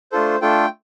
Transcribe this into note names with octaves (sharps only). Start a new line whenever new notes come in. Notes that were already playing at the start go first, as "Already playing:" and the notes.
A3 D4 F4 A4 C5
A3 D4 F4 A4 G5